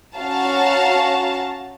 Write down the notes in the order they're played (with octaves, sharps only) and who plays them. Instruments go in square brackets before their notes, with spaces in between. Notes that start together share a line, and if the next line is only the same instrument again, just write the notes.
[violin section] C#4 F#4 F5 A5 A#5